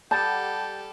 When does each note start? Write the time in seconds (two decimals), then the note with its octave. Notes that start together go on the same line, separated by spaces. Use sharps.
0.11 G3 G4 A4 F#5 A5 D#6 G6 A6